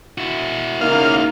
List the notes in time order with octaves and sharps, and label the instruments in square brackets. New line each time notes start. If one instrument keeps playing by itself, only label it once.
[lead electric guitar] E4 F#4
[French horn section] C#3 A#3 [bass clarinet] D#4 [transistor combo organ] F5